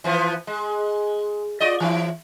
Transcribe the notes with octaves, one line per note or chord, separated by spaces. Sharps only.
E3 F3 B3
G#3
F4 D5 D#5
E3 E4